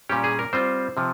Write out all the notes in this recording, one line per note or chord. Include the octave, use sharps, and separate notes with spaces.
A#2 G3 C#4 G4
G#4
A#4
G3 C4 F4 C5
C3 F3